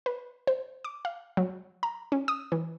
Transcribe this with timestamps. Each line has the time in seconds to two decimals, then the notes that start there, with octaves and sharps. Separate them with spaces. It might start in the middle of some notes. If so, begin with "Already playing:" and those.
0.06 B4
0.47 C5
0.85 D6
1.05 F5
1.37 F#3
1.83 A#5
2.12 C#4
2.28 D#6
2.52 E3